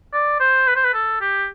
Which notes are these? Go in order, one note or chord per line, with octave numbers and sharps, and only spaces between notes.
D5
C5
B4
C5
B4
A4
G4